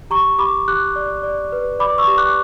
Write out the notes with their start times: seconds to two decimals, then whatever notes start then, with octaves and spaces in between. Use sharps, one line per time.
0.10 G4 A#5 C#6
0.38 G4 B5 D6
0.68 G4 D6 F#6
0.96 D5
1.23 D5
1.52 B4
1.79 D5 B5 D6
1.98 C#6 E6
2.08 G4
2.17 D6 F#6